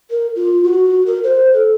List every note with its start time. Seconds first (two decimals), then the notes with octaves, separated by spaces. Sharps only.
0.10 A#4
0.36 F4
0.64 F#4
1.06 A#4
1.24 C5
1.53 A4